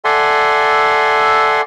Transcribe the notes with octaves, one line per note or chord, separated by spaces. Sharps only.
A4 D5 E5 F#5 G#5 C6